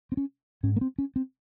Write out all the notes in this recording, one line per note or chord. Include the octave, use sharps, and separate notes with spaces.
C4
C#4
G#2 C#4
A#3
C4
C#4
C4